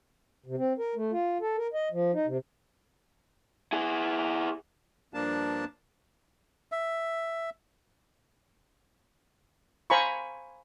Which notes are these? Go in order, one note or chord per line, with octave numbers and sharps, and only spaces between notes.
C3
C4
A#4
A3
F4
A4
A#4
D#5
F3
D#4
C3
E4 G#4
G2 F3 A#3 D4 A5
E5
C5 F5 G#5 A#5 B5 C#6